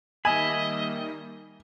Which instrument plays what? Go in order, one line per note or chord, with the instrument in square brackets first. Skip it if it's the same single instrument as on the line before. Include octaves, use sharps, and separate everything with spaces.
[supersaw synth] D#3 G3 A#3 [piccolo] D#5 [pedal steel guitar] E5 B5 [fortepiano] G#5